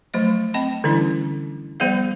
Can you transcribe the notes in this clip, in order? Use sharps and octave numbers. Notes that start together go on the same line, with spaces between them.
F3 F#3 A3 D#5
C4 D#5 A5 B5
D3 E3 G3 C#4 D4 E4
F3 G3 B3 G#4 C5 F5